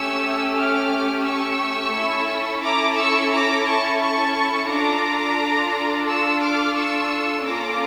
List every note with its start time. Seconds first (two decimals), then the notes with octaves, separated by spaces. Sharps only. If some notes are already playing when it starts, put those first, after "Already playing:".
Already playing: A3 C#4 G4 C#6 E6
0.56 D6 F6
1.25 C#6 E6
1.94 C#4 E4 A4
2.62 A#5 D6
2.97 C#6 E6
3.32 A#5 D6
3.65 A5 C#6
4.00 A5 C#6
4.69 D4 F4 A4 A#5 D6
6.07 C#6 E6
6.41 D6 F6
6.75 C#6 E6
7.44 A#3 C#4 F4 A4 A#5 D6